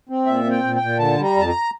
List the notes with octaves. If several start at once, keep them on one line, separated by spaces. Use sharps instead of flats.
C4
A#2 E5
C4
G5
A#2
G5
A#2
D3 A5
G3
A#5
F2 A5
A#5